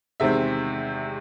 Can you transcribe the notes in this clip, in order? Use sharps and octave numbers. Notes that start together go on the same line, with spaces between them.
E2 C3 D#3 G#3 C4 E5